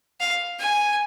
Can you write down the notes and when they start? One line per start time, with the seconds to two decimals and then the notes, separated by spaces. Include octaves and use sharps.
0.20 F5
0.59 G#5